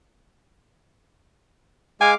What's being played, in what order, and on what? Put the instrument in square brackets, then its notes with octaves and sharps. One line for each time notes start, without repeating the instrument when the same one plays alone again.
[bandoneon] G#3 F5 D6 [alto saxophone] G#5